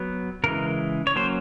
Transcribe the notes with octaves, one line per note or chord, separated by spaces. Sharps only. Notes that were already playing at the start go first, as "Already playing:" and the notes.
Already playing: F#3 B3
C#3 E3 G#3 A#4
C#5
F#3 A#3 C#4 C5